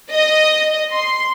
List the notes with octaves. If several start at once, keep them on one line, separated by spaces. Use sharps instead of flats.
D#5
C6